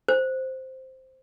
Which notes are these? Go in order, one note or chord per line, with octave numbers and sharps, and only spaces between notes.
C5